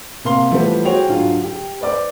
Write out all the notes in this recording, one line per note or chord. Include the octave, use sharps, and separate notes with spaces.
C3 A#3 F5 C6 G7
E3 F3 G3 A3 B3
F#4 G#4 C5 C#5 G5 F7
G#2 D3 F#3 F4
G4
B4 C5 D5 D6